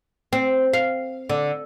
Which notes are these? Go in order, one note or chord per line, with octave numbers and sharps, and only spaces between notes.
C4
F5
D3